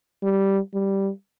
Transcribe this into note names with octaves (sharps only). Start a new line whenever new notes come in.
G3
G3